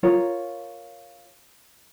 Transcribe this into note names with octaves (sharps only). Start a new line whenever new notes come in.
F4 A#4 C#5